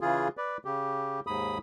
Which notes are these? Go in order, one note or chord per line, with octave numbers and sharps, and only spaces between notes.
C#3 E3 F4 G#4
B4 D5
C#3 G4
D#2 G#2 B5 D#6